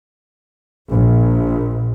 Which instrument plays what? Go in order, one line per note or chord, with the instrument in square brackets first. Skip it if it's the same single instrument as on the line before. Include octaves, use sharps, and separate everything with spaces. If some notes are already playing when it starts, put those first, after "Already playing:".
[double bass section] A#1